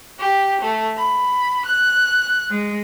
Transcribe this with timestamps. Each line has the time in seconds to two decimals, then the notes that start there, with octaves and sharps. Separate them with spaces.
0.19 G4
0.61 A3
0.96 B5
1.64 F#6
2.50 G#3